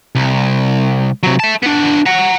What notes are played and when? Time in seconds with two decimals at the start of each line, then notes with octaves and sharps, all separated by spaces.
0.15 C2
1.23 C3 F#3
1.39 E5 A5
1.63 B3 D4
2.06 F#5 A#5